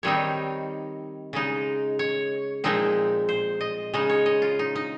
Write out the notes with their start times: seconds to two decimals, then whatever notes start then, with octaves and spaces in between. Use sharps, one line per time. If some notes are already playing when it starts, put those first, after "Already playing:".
0.03 D#3 G3 C4 D#4 C#5
1.33 C#3 G#3 D#4
1.99 C#5
2.64 A#2 F3 G#3 C4 D#4
3.29 C5
3.61 D#5
3.94 C#3 G#3 D#4 D#5
4.09 C#5
4.26 D#5
4.42 F4
4.59 D#4
4.76 D#4